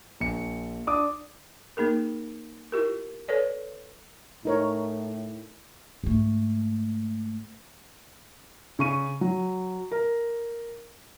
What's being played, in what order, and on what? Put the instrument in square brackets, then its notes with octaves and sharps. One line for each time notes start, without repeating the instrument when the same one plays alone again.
[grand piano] A#1 C#7
D4 D6 D#6
[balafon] A#3 D#4 G#4 A#4
E4 F4 G4 A#4
A4 B4 C#5 D5
[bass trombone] A2 [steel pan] D#4 A#4 C#5
[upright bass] G#2 A3
[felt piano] C#3 C#6 D#7
F#3
A#4